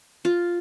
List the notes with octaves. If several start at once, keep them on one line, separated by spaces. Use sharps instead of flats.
F4